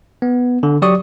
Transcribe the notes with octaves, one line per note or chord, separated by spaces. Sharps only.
B3
D3
F#3 G4 D5 C#6 D#6